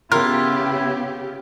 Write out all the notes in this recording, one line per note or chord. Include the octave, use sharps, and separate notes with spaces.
C#3 B3 E4 F4 G4 A#4